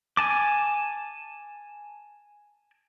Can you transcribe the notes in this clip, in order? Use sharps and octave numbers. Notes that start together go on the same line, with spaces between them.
G#5 A5 D6